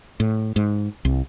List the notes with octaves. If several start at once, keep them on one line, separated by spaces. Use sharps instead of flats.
A2
G#2
C2